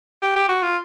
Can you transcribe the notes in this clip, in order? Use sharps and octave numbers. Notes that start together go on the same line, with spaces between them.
G4
G4
F#4
F4